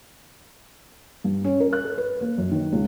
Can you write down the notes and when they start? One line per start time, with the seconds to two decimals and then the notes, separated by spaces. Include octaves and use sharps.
1.24 G2
1.44 C#4
1.60 A#4
1.73 F#6
1.85 A4
1.98 B4
2.21 A#3
2.38 F#2
2.52 D#3
2.73 C#2